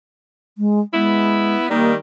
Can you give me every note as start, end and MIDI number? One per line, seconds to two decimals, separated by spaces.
0.58 0.80 56
0.93 1.56 56
0.93 1.66 59
0.93 1.66 64
1.69 1.95 51
1.69 1.95 55
1.69 1.92 58